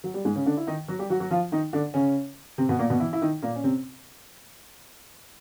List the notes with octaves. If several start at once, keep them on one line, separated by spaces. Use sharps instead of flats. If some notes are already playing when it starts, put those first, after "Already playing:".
F#3
G3
G#2 G#3
C#3 C#4
D3 D4
E4
D#3 D#4
F#3 F#4
G3 G4
F#3 F#4
F#3 F#4
F3 F4
D#3 D#4
D3 D4
C#3 C#4
C3 C4
B2 B3
A#2 A#3
B2 B3
E3 E4
E4
D#3 D#4
A#2 A#3
C#4
C3 C4